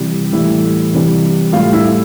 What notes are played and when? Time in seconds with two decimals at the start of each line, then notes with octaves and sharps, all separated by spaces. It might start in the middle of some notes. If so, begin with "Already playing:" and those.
Already playing: C3 E3 G3
0.33 A2 E3 G3 E4
0.93 C3 E3 G3
1.53 A2 G3 F4
1.73 E4